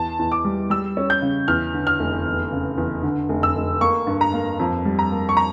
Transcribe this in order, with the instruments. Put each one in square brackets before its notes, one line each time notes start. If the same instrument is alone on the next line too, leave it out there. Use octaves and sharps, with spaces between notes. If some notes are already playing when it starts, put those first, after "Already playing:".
Already playing: [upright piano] E2 [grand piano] A5
[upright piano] E2
[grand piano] D6
[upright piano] G3
[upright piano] G3 [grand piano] E6
[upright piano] C#4
[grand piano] G6
[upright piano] C#3
[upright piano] E2 [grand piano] F6
[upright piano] D3
[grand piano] F6
[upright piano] F1
E2
C#3
E2
D3
F1
[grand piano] E6
[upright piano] F1
[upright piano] A#3 [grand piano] C#6
[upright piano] G2
[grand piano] A#5
[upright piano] A#3
F2
G3
[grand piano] A#5
[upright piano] A#3
[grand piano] C#6
A#5